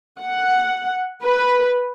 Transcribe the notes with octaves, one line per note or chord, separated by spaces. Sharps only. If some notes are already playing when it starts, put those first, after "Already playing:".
F#5
B4